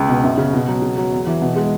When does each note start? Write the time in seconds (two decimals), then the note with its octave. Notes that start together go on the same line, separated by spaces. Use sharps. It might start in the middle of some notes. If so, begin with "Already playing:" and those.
Already playing: C#2
0.08 B2
0.23 F#2
0.38 C#3
0.53 B2
0.68 F#3
0.82 C#3
0.98 F#3
1.12 E2
1.27 E3
1.42 B2
1.56 G#3